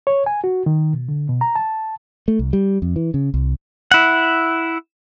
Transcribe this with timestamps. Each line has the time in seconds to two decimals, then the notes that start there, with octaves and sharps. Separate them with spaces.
0.07 C#5
0.26 G#5
0.44 F#4
0.66 D#3
0.93 B2
1.09 D3
1.29 B2
1.41 A#5
1.55 A5
2.28 A3
2.39 C2
2.53 G3
2.82 F2
2.96 E3
3.14 C#3
3.34 C2
3.91 E4 F#5